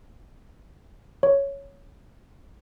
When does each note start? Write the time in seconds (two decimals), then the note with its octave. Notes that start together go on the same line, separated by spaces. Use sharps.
1.23 C#5